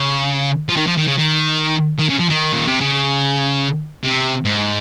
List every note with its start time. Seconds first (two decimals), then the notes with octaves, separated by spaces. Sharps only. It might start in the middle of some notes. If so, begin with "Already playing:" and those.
Already playing: C#3
0.69 F3
0.77 D#3
0.87 F3
0.97 D#3
1.07 C#3
1.18 D#3
1.99 D#3
2.09 C#3
2.19 F3
2.30 D#3
2.53 A#2
2.67 C3
2.81 C#3
4.03 C3
4.45 G#2